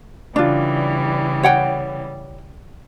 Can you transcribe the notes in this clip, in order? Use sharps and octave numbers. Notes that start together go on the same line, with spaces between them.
C#3 E3 G3 D4 F4
C#5 F#5 G5